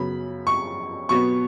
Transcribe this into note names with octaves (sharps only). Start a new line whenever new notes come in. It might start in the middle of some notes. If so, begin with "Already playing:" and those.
Already playing: F#2 C#3 F#3 B3 B5
C#6
B2 F#3 B3 C#6